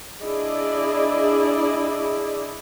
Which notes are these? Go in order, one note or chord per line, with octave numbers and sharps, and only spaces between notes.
D4 E4 G#4 D5 D#5